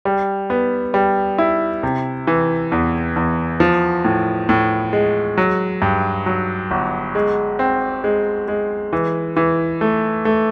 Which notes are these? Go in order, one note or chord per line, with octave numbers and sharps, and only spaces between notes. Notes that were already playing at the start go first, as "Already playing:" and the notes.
G3
B3
G3
E4
C3
E3
E2
E2
F3
A2
A2
G#3
F#3
G2
F#3
G1
G#3
C4
G#3
G#3
E3
E3
A3
A3